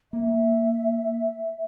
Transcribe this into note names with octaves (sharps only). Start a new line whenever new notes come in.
A#3 E5